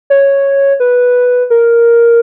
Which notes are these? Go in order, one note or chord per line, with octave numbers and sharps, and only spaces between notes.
C#5
B4
A#4